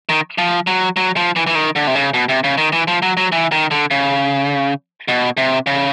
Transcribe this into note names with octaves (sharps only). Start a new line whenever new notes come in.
D#3
F3
F#3
F#3
F3
E3
E3
D#3
D3
C3
C#3
B2
C3
C#3
D#3
E3
F3
F#3
F#3
E3
D#3
D3
C#3
B2
C3
C#3